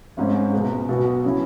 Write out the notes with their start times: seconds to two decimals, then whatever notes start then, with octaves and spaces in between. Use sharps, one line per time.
0.17 G#1 G#2 G#3 C#4
0.53 C#2 B2 B3 G#4
0.88 B1 B2 B3 F#4
1.25 C#3 F#3 C#4 E4